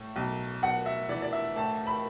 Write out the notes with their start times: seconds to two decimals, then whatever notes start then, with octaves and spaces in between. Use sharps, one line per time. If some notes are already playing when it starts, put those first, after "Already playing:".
Already playing: A2
0.16 B1
0.62 B1 F#5
0.86 E5
1.09 E3 D5
1.22 D5
1.32 E5
1.56 A2 A5
1.87 B5